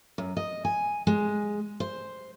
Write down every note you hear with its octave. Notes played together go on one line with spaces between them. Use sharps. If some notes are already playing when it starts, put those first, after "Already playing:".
F#2
D#5
G#5
G#3
C5